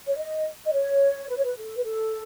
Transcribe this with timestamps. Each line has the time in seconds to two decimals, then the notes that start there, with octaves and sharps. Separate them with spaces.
0.07 C#5
0.17 D#5
0.66 D#5
0.73 C#5
1.29 B4
1.36 C#5
1.44 B4
1.56 A4
1.76 B4
1.84 A4